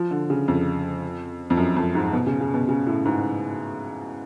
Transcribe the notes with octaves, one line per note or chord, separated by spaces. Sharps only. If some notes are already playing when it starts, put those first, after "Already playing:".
Already playing: F3
D3
C#3
F2
F2
F#2
F2
G#2
B2
C#3
C#3
B2
C#3
A2
G#2